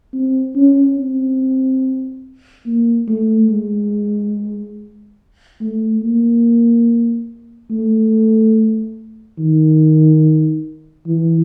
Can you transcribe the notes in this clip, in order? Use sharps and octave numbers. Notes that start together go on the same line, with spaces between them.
C4
C#4
C4
A#3
A3
G#3
A3
A#3
A3
D#3
E3